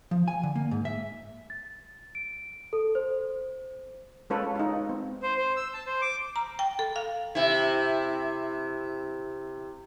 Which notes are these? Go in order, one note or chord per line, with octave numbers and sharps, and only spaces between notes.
F3
G#5
D3
A#3
G#2
E5
A6
D7
A4
C5
G#3 C#4 F4 A4 B4 C#5
D#4 F4
C4
C5
C5
E6
A5
C5
D6
A#5
G5
A4
F5
C3 E4